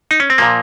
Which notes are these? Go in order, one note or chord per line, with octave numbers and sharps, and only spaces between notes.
D#4
C#4
C4
A#2 F3 A#3